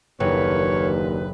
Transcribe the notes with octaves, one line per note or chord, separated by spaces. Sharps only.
F#1 D#2 A#2 D3 B4 C#5